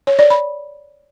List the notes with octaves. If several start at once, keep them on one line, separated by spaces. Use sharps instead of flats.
C#5
D5
B5